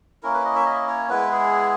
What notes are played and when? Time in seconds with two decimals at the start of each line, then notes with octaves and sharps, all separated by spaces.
0.23 A#3 C#4 E4 A#4
0.34 B4
0.45 D#5
0.55 E5
0.66 D#5
0.88 C#5
1.09 G#3 B3 E4 B4
1.32 G#4